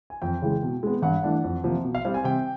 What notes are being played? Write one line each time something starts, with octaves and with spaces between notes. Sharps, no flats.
G#5
F2 G5
C#3 E3 G#3
B2
G#3 B3
G2 F#5
E3 A3 D4
F2
C3 F3 A#3
B2
F5
G3 C4 F5
G#5
C3 G5